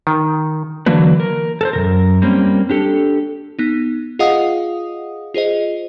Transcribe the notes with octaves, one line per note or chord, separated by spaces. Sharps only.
D#3
D3 E3 F#3 A#3 D4 B4
A#4
A4 A#4 C5
F#2 A#2 A#4
G3 A#3 C4 C#4
D4 G4 A4
B3 D#4
F4 G#4 D#5 F5 F#5 D#6
F4 G#4 C5 D#5